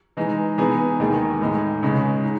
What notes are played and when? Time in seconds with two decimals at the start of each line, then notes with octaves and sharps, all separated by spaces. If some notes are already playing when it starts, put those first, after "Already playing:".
0.17 E3 G#3 D#4
0.58 E3 B3 D#4 G#4
1.00 D#2 D#3 G#3 D#4 G#4
1.41 A2 G#3 D#4
1.82 C#2 C#3 G#3
2.24 D#4